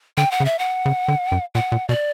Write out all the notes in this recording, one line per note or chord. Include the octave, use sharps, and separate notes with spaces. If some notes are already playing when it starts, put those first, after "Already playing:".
D3 G5
F#5
C#3
E5
F#5
C#3
D3
F#2
A#2 F#5
A#2
B2 D5